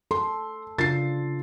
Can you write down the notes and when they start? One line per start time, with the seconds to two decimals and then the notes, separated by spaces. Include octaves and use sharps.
0.11 A4 C6
0.79 C#3 D4 F4 A6 C7